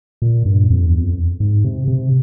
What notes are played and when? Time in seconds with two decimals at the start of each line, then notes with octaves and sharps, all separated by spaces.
0.22 A#2
0.45 G2
0.70 F2
0.86 E2
1.01 F2
1.40 G#2
1.64 C3
1.88 C3